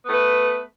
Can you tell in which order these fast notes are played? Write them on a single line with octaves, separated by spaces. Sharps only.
B3 A3 B4